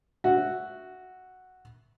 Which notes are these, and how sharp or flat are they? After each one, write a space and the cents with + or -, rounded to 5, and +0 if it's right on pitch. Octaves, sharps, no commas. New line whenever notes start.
F#4 +0 E5 +0